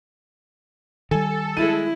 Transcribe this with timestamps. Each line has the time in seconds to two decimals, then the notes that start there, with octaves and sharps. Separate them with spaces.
1.11 D#3 G3 A4 G#5
1.57 G#3 E4 D#7